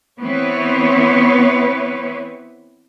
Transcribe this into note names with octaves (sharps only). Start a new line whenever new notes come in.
E3 B3 C4 B4 C#5